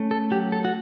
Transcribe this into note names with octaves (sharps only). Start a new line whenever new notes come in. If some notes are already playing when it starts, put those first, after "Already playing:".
Already playing: A3 C#4
A4
F#3 G4
A4
F#4